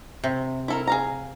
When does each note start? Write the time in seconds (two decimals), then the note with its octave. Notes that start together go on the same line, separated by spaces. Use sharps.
0.24 C3
0.68 E4 A4 A#4
0.87 G#4 F5 A#5